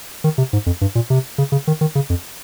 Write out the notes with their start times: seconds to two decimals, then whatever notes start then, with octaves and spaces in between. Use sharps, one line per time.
0.24 D#3
0.38 C3
0.53 G#2
0.66 F2
0.81 G2
0.95 A#2
1.10 C3
1.38 C#3
1.52 C#3
1.67 D#3
1.81 D#3
1.95 C#3
2.10 F2